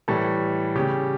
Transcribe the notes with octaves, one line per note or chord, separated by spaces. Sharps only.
A2 E3 G3 A4
C#3 G3 G4